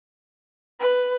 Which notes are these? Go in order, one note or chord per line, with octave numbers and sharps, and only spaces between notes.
B4